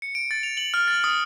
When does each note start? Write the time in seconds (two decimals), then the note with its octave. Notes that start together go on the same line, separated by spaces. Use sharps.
0.02 C#7
0.15 D7
0.31 A6
0.43 F7
0.57 F#7
0.74 F6
0.88 A6
1.04 D#6